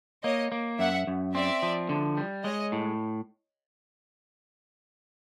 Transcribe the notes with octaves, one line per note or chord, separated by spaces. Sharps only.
A#3 C#5 D#5
A#3
F#2 E5 F#5
F#2
C4 D5 E5
F3
D3
G3
G#3 C#5 D#5
A2